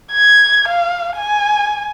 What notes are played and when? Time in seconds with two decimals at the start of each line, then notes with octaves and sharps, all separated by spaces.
0.12 G#6
0.68 F5
1.16 G#5